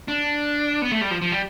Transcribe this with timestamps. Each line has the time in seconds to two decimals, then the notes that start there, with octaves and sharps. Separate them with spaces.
0.08 D4
0.82 B3
0.92 A3
1.01 G3
1.11 F3
1.21 F3
1.31 G3